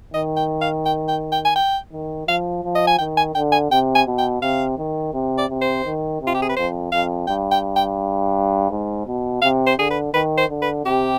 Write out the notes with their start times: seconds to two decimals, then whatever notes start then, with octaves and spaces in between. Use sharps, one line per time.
0.14 D#3 D#5
0.37 G5
0.61 F5
0.86 G5
1.08 G5
1.32 G5
1.45 G#5
1.56 G5
1.92 D#3
2.27 F3 F5
2.63 F3
2.76 D#5
2.88 G#5
2.99 D#3 G5
3.17 G#5
3.35 D3 G5
3.52 G#5
3.70 C3 G5
3.95 G#5
4.06 B2
4.19 G5
4.42 C3 F5
4.78 D#3
5.13 C3
5.38 D5
5.49 C3
5.62 C5
5.85 D#3
6.21 C3
6.27 F4
6.34 G4
6.42 G#4
6.49 B4
6.57 F2 C5
6.92 F2 F5
7.27 G2 G5
7.52 G5
7.76 G5
8.71 G#2
9.07 B2
9.42 C3 F5
9.67 C5
9.78 D3 G#4
9.90 B4
10.13 D#3 B4
10.38 C5
10.49 D3
10.62 B4
10.85 C3 G4